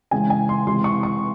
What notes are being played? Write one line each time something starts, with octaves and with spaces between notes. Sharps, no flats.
C#3 E3 G#3 G#5
G#5
C6
C3 E3 G#3 C6
C#6
C#6